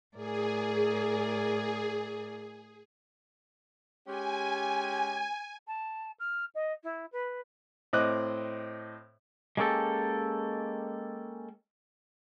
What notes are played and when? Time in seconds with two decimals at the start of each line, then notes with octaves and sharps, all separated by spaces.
0.16 A2 G#4 A#4 D5
4.07 G#3 C#4 G4 G#5
5.67 A5
6.19 F6
6.55 D#5
6.83 E4
7.12 B4
7.93 A2 C4 D#5 D6 D#6 F#6
9.57 G#3 A#3 C#4 G4 A4